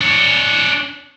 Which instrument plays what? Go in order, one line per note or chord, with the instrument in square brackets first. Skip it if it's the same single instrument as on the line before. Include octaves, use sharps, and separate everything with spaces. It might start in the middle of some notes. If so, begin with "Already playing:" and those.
[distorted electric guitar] D4 C#5